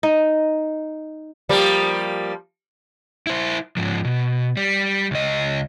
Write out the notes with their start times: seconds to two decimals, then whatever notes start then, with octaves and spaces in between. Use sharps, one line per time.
0.03 D#4
1.49 F3 G3 A#3
3.27 E4 C5
3.77 G#2 F3
4.05 B2
4.57 G3
5.11 C#2 D#5